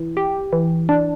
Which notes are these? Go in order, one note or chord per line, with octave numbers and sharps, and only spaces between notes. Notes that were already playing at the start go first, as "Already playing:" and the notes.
Already playing: E3
G4
E3
D4